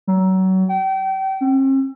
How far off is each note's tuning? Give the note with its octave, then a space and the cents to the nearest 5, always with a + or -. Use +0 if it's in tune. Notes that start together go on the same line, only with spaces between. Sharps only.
F#3 +30
G5 -35
C4 +45